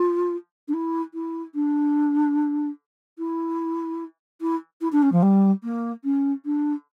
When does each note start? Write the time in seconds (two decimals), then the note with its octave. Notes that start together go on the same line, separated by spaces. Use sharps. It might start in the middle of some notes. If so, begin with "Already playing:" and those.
Already playing: F4
0.68 D4
0.73 E4
1.14 E4
1.54 D4
3.18 E4
4.41 E4
4.81 E4
4.92 D4
5.02 C#4
5.12 F3
5.22 G3
5.63 A#3
6.04 C#4
6.45 D4